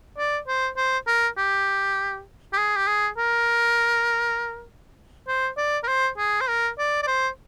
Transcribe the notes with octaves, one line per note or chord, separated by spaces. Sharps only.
D5
C5
C5
A#4
G4
G4
G#4
G4
G#4
A#4
C5
D5
A#4
C5
G#4
C5
A#4
D5
D5
C5